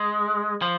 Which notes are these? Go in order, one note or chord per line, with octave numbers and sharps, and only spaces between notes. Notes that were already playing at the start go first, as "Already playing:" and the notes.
Already playing: G#3
F3